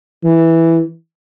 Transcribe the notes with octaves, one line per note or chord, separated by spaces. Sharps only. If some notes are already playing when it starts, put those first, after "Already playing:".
E3